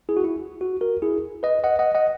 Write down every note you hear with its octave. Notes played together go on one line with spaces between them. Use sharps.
E4 G#4
F#4
E4
F#4
F#4 A#4
E4 G#4
B4 D#5
D#5 F#5
D#5 F#5
D#5 F#5